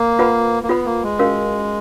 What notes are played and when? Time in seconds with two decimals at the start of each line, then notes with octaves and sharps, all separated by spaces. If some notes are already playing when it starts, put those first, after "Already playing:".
Already playing: A#3
0.19 F4 B4 F#5 B5
0.63 A#3
0.69 B3 F4 B4 F#5 B5
0.86 A#3
1.03 G#3
1.19 C#4 F#4 A#4 F5